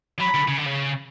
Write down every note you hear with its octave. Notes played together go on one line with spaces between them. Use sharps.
F#3 B5
D3
C#3
D3
C#3